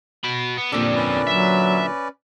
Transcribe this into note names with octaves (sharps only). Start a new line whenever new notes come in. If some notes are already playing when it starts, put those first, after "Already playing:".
F#4 B5
B3
A#2 D3 C4 G4 A4
C#4 B4 D5
F#3 E5